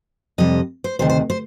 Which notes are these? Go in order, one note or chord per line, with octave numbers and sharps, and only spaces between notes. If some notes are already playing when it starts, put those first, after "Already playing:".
F2 C3 G3 D#5
C5
D2 C3 D#3 C5
C5
C5